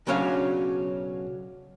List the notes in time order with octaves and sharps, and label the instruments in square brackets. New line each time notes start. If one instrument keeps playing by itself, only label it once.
[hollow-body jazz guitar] B1 C#3 F#3 C#4 D4 F5